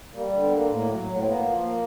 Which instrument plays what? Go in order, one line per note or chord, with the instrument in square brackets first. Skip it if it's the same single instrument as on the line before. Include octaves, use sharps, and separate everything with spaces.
[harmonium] G3 A#3
D3
B3
A#3
A2 A#3
F#3
A2
C4
A#3 B3
F3
A#3